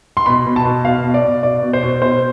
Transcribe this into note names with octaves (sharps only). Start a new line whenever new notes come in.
C6
B2 B5
B2
A5
B2
B2 F5
B2
D5
B2
B2 D5
B2
C5
B2
B2 C5